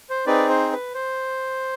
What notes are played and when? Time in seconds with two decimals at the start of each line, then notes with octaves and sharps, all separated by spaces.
0.10 C5
0.26 C4 D#4 G#4 B4 D5
0.49 C5
0.72 B4
0.94 C5